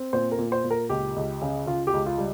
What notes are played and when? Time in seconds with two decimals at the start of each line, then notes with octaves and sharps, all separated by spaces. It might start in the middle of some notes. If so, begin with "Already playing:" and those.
Already playing: C4
0.13 A#2 C5
0.32 A#4
0.39 A#2
0.52 C5
0.64 A#2
0.71 A#4
0.89 C#2 G4
1.16 C#2
1.42 C#3
1.67 C#3 F4
1.87 G4
1.93 C#2
2.06 F4
2.18 G3